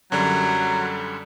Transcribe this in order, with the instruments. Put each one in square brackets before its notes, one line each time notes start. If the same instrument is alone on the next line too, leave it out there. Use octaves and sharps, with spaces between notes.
[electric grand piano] F#2 D3 G3 [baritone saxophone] F#3